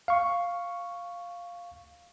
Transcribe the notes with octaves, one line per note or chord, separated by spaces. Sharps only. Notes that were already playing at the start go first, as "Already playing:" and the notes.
F5 C#6